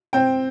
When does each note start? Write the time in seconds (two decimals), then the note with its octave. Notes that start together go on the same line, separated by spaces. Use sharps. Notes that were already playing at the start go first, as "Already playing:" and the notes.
0.13 C4 G5